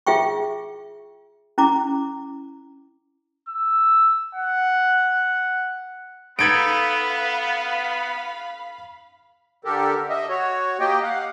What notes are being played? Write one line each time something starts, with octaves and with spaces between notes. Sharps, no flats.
F4 G#4 E5 G5 C#6
C#4 E4 A#5 D6
E6
F#5
B3 D#4 A4 B4 F5 B5 G#6 D7
D3 G4 A4 A#4
D#5 E5
F#4 C#5
A#3 G4 D#5 G5
F5 F#5